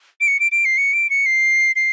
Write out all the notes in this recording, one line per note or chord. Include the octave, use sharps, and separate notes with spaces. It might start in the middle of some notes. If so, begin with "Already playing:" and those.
D7
C#7
D7
D7
C7
C#7
D7
C#7
C7
C7